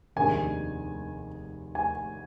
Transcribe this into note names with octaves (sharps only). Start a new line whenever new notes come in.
F1 D#2 D#3 G#3 D4 G#5
G#5